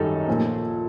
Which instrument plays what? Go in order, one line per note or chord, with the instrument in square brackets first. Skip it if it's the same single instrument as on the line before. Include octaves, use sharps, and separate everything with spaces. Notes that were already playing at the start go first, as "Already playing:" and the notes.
Already playing: [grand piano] F#2 D#3 G3 D#4 A4
A#2 F3